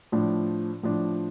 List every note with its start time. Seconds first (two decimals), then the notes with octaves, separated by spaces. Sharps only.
0.12 A2 F3 D4
0.83 A2 F3 D4